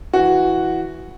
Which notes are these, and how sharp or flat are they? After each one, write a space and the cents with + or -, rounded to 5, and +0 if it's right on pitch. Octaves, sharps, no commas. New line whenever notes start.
E3 +0 F#4 +0